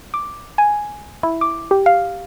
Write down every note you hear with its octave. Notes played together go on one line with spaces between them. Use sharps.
D6
G#5
E4
D6
G4
F5